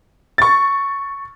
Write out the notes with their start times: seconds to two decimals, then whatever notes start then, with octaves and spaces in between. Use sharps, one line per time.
0.38 C#6 A6